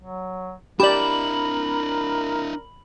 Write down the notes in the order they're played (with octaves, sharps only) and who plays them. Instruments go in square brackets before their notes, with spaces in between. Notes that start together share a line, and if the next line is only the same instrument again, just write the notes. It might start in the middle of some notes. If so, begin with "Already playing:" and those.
[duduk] F#3
[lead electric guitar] D4 E4 [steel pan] G4 D5 [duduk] A#4 [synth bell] B5 F#7